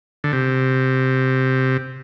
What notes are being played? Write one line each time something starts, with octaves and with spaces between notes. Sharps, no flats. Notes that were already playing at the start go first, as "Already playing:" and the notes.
D3
C3